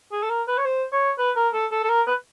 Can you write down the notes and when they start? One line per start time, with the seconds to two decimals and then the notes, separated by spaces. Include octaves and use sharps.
0.12 G#4
0.23 A4
0.29 A#4
0.47 B4
0.58 C#5
0.65 C5
0.92 C#5
1.18 B4
1.36 A#4
1.53 A4
1.71 A4
1.84 A4
1.89 A#4
2.07 B4